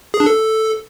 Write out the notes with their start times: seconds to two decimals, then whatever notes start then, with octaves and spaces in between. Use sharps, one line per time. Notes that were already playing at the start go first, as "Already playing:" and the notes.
0.14 G#4
0.20 D4
0.26 A4